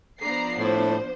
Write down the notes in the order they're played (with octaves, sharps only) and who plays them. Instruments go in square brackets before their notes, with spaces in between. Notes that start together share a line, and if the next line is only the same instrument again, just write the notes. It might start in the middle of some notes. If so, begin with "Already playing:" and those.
[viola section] F3 B3 D4 [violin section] A#5 C7
[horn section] A2 [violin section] C5